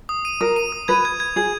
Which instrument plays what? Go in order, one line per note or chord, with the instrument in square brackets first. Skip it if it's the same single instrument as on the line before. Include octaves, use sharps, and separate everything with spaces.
[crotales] D#6
D#7
[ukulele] A#4 [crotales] D#6
[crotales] D#7
D#6
[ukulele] B4 [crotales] G#6
[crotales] G#6
G#6
[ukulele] G#4 [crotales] G#6